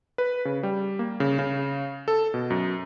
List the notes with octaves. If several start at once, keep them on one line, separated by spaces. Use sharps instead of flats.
B4
C#3
G3
A#3
C#3
C#3
A4
B2
F#2